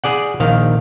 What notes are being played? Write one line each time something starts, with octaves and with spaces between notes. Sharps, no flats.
G#4 D5 F#5
A#1 D#3 F5